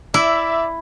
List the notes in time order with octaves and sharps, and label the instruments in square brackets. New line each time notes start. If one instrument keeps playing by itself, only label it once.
[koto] E4 [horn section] D5 E5